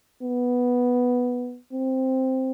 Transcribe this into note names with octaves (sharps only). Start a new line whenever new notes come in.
B3
C4